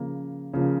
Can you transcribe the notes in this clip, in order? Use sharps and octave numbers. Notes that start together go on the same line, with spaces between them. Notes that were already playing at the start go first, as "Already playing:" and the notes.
Already playing: C#3 F3 A#3
C#3 F3 A#3